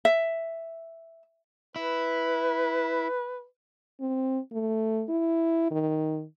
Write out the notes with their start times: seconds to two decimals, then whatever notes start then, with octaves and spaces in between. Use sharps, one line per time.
0.05 E5
1.76 E4 B4
4.00 C4
4.52 A3
5.09 E4
5.71 D#3